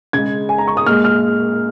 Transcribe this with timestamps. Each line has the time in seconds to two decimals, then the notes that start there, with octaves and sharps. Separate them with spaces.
0.13 C#3 G#3 G#6
0.49 G#5
0.58 A#5
0.68 C#6
0.77 D#6
0.86 A#2 G#3 F6
1.04 F6